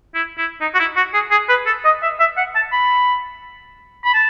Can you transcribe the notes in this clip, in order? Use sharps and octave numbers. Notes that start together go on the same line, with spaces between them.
E4
E4
D#4
F#4
E4
F#4
G#4
G#4
B4
A4
D#5
E5
E5
F#5
A5
B5
B5
A5